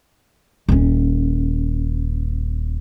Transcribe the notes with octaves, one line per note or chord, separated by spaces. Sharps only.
D#1 C#4